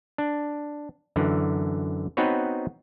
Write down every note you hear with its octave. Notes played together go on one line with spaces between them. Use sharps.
D4
F#2 D3 E3
B3 C4 D#4 F#4 B4 C#5